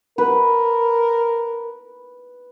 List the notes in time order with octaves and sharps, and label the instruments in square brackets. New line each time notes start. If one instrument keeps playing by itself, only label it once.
[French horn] A#4 [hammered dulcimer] B4